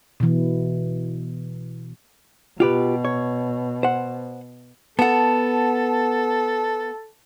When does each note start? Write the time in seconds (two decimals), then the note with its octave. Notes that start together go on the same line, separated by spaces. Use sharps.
0.20 B2 E3
2.60 B2 F4 G4 B4
3.05 C#5
3.83 C5 F#5
4.99 B3 A4 F#5 A5